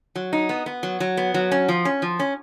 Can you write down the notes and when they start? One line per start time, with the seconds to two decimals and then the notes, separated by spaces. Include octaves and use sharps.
0.15 F#3
0.33 D#4
0.49 B3
0.66 B3
0.83 F#3
1.00 F#3
1.17 B3
1.34 F#3
1.52 C#4
1.68 F3
1.85 C#4
2.02 F3
2.20 C#4